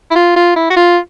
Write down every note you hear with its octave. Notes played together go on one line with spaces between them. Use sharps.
E4
F4
F4
E4
F#4
F4